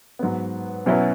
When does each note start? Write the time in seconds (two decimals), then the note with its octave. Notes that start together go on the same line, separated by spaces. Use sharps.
0.19 G#2 F#3 B3
0.86 B2 F#3 C#4 E4 B4